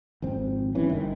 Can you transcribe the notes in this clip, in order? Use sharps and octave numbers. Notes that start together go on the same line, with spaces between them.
G#1 F2 C4
B1 G2 E3 C#4
G1 D#3